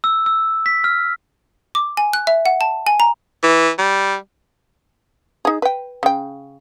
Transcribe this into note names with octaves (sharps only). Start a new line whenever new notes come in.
E6
E6
B6
F6
D6
G#5
F#6
E5
F#5
A5
G#5
A#5
E3
G3
D#4 G#4
B4 G5
C#3 G5